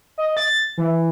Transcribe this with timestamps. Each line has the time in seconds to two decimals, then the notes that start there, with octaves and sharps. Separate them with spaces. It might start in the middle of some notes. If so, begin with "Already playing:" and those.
0.18 D#5
0.37 A6
0.77 E3